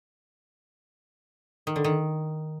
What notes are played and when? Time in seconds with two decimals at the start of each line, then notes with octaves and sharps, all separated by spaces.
1.67 D#3
1.76 D3
1.84 D#3